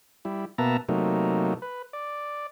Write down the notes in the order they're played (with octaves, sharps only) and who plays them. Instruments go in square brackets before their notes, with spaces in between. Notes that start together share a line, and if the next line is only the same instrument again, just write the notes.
[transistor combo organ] G3 E4
B2 A#3 B3 E5 A5 A#5
C3 F#3 A3 A#3 D#4
B4
D5